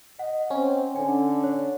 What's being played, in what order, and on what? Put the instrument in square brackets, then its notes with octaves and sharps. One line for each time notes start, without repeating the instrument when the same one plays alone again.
[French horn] D#5 [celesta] F#5
[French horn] C4 [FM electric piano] C#4
[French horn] D3 [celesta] G#5
[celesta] C#5